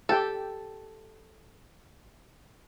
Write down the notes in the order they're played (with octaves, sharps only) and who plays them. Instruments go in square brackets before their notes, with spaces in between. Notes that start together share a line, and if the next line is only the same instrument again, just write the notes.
[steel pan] G4 G5 A5 [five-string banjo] A4